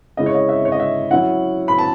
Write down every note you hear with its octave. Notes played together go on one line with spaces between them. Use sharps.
C#3 G#3 C#4 E4 D#5
C#5
D#5
E5
C#5
D#5
E5
F#3 C#4 E4 F#5
B5
A5